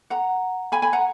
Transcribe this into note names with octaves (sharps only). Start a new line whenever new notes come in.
F#5 A#5
G#5 B5
G#5 B5
F#5 A#5